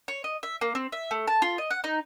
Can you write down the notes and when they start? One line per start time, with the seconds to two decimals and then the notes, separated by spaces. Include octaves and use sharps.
0.08 C#5
0.24 D#5
0.43 E5
0.61 A#3
0.75 C4
0.92 E5
1.11 A3
1.27 A5
1.42 F4
1.58 D#5
1.71 F#5
1.84 D#4